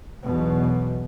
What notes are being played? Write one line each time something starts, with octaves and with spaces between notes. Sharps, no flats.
B1 E2 B2